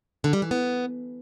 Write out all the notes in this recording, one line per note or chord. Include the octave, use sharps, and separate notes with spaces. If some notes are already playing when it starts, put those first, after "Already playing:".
D3
G3
E3
B3